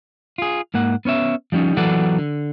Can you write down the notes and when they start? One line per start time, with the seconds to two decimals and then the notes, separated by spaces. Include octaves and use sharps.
0.38 F4 G#4
0.74 G#2 A#3 F#5
1.05 B3 C#4 C#5 E5
1.52 F3 G3 A#3 C#4 D#4
1.77 E3 F#3 B3 A4 D5 F#5
2.18 D3